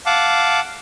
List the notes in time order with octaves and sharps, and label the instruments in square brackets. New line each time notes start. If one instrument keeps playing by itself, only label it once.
[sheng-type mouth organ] F5 F#5 A5 D6